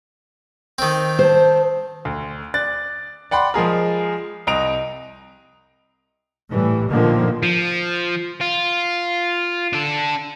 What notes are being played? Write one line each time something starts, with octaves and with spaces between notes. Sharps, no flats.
D#3 C4
C5 A5
D2
D5 F#6 A6
D5 F#5 G5 B5 C6
F3 G#3 G#4 A#4
C2 D#5 A#5 D7 F7
A2 E3 G3
A#2 D3 D#3 F3 A#3
F3
F4
D4 A4